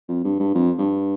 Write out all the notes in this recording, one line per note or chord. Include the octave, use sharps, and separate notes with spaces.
F2
G2
G2
F2
G2